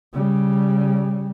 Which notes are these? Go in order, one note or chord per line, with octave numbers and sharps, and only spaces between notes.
C#3 G3